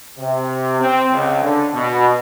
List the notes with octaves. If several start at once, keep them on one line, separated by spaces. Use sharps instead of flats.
C3
C4
C#2
D3
B2